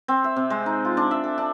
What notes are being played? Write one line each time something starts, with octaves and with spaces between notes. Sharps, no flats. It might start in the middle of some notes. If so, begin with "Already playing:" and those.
C4
E5
C3
G#3
D#4
F4
D4
E5
A4
D4